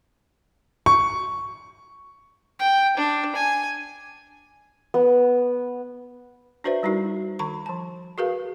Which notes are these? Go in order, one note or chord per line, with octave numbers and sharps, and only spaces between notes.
C#6
G5
D4
G#5
B3
D4 F#4 B4 C5 D5 E5
G3 D#4 E4 F#4 A#4
D#3 B5 C#6
F3 A5
F#4 G#4 A#4 B4 F5